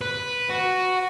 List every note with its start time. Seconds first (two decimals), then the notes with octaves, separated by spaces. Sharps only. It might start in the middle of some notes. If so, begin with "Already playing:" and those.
0.01 B4
0.49 F#4